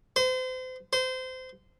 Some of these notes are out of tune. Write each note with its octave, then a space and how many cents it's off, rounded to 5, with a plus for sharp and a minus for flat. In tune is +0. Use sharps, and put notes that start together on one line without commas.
C5 -35
C5 -25